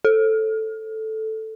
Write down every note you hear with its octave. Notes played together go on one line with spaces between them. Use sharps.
A4